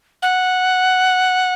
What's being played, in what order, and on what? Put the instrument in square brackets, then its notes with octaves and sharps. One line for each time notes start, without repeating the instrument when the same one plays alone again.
[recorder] F#5